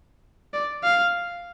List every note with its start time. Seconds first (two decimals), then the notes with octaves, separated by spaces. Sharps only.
0.54 D5
0.84 F5